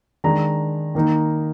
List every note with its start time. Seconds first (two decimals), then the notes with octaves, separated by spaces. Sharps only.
0.24 D#3 G#3 D4 A#5
0.95 D#3 A#3 D#4